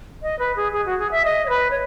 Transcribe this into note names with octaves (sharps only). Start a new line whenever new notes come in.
D#5
B4
G#4
G#4
F#4
G#4
E5
D#5
C#5
B4
C#5